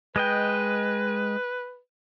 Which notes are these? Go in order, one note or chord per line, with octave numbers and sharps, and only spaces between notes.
G#3 B4 D#5 G5